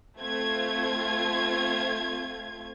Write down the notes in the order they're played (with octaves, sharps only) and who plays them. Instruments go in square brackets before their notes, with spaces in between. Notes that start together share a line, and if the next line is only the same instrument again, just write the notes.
[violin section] A3 C4 F4 G#6